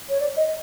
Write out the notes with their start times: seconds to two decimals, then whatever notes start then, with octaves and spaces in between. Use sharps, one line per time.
0.09 C#5
0.20 D5
0.36 D#5